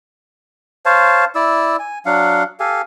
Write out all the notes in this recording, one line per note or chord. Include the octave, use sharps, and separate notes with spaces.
C5 C#5 F5 A5
E4 D5 E6
G#5
F#3 D4 F5 F#5
G4 A4 F5 G#5